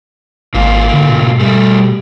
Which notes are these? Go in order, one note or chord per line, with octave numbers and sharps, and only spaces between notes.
G#1 G#2 A#3 F4
D3
B2
G3 A3